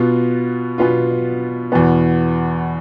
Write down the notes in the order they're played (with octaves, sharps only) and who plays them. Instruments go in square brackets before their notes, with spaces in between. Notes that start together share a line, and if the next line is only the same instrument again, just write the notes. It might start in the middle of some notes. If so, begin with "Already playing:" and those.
Already playing: [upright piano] B2 B3 F4
B2 B3 F4
E2 B2 B3